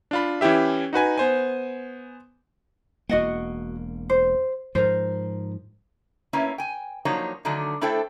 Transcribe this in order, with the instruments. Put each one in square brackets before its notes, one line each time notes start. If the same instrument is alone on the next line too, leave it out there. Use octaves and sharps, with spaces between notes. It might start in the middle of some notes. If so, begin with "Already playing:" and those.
[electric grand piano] D4 F4 B5
E3 C#4 E4 G4 E5
D#4 F#4 B4 G#5
B3 C5 G#5
[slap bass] E1 A#3 [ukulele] F#4 D#5 F#5
[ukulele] C5
[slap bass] G#2 F3 [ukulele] A#4 C5
[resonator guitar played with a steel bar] A3 A#3 C#4 E4 B4 C#5
G5 G#5
F3 F#3 A#3 D4 D#4 C#5
D3 D#3 F#3 A3 D4
A3 D4 E4 A4 C5 G5